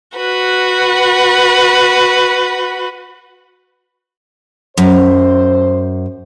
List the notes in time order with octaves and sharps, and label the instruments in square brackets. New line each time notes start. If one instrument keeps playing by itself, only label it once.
[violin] F#4 B4
[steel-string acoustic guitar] F#2 [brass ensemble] C5